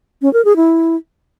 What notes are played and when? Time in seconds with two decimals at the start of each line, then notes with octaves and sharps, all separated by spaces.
0.22 C#4
0.33 A#4
0.45 G#4
0.56 E4